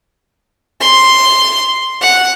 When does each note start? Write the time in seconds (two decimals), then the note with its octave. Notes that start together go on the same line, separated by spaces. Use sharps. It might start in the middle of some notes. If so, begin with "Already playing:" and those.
0.81 C6
2.01 F#5